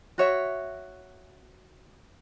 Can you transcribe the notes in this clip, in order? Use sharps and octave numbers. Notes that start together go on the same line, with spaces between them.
F#4 C#5 E5